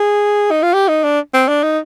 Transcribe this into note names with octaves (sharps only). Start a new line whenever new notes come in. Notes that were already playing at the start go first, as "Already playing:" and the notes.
Already playing: G#4
D#4
F4
G4
D#4
D4
C4
D4
D#4